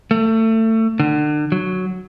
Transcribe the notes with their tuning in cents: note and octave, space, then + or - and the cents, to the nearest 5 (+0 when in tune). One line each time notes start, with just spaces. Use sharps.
A3 +25
D3 +35
F#3 +0